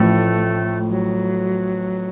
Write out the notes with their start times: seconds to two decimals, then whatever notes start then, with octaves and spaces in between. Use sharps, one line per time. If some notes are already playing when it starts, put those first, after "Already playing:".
Already playing: A1 A2 F3 A3
0.90 F#3